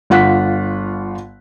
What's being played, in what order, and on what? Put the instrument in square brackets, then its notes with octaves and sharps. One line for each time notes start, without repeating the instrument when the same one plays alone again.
[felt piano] G1 F4 F#5 F#6 B6